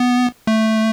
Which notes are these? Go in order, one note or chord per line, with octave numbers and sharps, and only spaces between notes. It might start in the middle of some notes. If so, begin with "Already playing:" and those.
Already playing: B3
A3